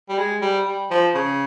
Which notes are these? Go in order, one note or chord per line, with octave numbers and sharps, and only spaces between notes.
G3
G#3
G3
G3
F3
C#3